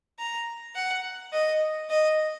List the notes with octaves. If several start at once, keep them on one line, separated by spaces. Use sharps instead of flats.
A#5
F#5
D#5
D#5